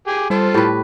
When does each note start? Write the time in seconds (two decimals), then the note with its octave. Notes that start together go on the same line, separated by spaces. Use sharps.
0.07 G4 G#4
0.30 G3 F4 A4 C5
0.54 A2 G4 B4